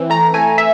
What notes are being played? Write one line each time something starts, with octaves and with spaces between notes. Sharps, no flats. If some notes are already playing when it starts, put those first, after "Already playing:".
Already playing: E3 C4
A3 A#5
A3 G#5
E5